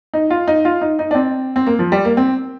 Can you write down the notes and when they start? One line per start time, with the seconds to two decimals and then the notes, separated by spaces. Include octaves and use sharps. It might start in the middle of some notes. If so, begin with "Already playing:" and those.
0.14 D#4
0.30 F4
0.48 D#4
0.65 F4
0.81 D#4
0.99 D#4
1.11 D4
1.15 C4
1.56 C4
1.67 A#3
1.79 F3
1.92 G3
2.05 A#3
2.17 C4